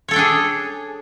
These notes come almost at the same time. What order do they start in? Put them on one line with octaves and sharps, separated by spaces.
C#5 A4 G5 D4 G#4